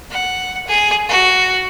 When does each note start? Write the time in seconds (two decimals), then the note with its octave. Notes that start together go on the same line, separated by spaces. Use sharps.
0.10 F#5
0.67 G#4
1.09 F#4